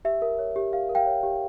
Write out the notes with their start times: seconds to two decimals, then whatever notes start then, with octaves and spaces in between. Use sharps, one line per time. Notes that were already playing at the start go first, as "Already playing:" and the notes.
0.05 G4 E5
0.22 A#4
0.39 C#5
0.56 G4
0.73 G4 F5
0.89 A#4
0.95 F5 G5
1.06 C#5
1.23 G4